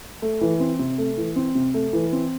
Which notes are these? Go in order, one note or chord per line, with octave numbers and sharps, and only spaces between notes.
A3
E3
C4
C3
A3
E3
C4
C3
A3
E3
C4